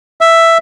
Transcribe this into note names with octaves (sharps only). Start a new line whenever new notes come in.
E5